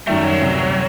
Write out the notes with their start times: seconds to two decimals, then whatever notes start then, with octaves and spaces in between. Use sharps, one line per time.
0.07 F#2 D#3 G3 A3
0.24 F#3
0.41 D2 C3 G3